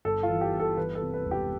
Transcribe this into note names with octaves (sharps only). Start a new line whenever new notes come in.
G1 A4
F4
E3
G4
G1
A4
E3 B4
A4
C3
B4
E1
G4